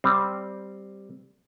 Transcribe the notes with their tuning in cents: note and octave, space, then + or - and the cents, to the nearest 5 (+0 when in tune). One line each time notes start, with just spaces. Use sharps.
G3 +0 C4 +0